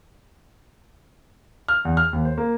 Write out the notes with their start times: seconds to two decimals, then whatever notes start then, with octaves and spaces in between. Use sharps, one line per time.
1.68 F6
1.85 E2
1.97 F6
2.13 D#2
2.25 C5
2.38 A#3